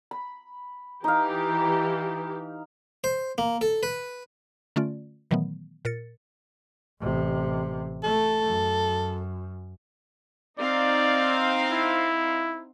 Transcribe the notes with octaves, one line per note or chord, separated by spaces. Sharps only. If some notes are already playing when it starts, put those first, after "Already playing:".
B5
E3 D#4 G4 F5
C5
A#3
A4
B4
D3 A3 C#4 F4 D5
A#2 D#3 E3 F#3 A3 B3
A#2 A#4 A6 C#7
A1 C3
A3 A4
F#2
C4 D#4 D5 F5
E4